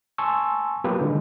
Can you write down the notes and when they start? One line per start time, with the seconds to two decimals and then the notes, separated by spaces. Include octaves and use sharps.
0.18 G#5 A5 C6 C#6 E6
0.84 F#3 A#3 B3 F4 G4 B4
1.01 D3 D#3 G#3